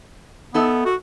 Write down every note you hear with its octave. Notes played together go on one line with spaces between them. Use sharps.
B3 D#4 A4 E5
F#4